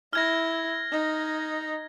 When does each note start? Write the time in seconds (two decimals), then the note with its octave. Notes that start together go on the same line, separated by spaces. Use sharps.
0.13 E4 F6 G#6 A#6
0.92 D#4